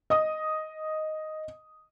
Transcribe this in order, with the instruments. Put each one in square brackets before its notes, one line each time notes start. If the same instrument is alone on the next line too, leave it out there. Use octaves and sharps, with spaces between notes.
[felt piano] D#5 D#6